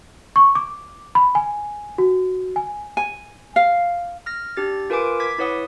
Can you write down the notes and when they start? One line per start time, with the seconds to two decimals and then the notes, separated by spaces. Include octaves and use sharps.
0.36 C#6
0.55 D6
1.15 B5
1.35 G#5
1.98 F#4
2.56 G#5
2.97 G#5
3.56 F5
4.26 F6 A#6
4.57 D4 G4 A6
4.90 F4 A#4 B4 G#5 D6 D7
5.20 D6 G#6 B6
5.38 E4 B4 C#5 F#5 D#6